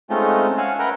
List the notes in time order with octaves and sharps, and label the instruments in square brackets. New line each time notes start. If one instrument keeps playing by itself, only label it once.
[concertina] G#3 A3 C4 C#4 D#4 F4
C#4 F5 F#5 G#5 E6
A#4 B4 E5 F#5 G5 A#5